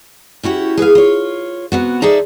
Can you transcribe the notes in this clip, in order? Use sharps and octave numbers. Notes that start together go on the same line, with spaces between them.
C#4 E4 F#4 G4
G#4 B4 D5 F5
F4 C#5
C3 B3 F#4
D#4 G#4 A4 C5 D5 E5